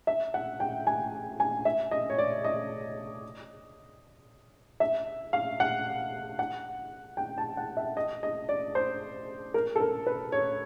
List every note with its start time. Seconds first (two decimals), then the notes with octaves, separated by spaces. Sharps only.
0.07 E5
0.34 F#5
0.60 G5
0.87 G#5
1.40 G#5
1.65 E5
1.91 D#5
2.10 C#5
2.18 D5
2.44 D#5
4.80 E5
5.33 F5
5.60 F#5
6.39 F#5
7.17 G5
7.38 A5
7.57 F#5
7.77 E5
7.97 D#5
8.23 D#5
8.49 D5
8.75 C5
9.54 A#4
9.76 A4
9.80 A#4
10.07 B4
10.32 C#5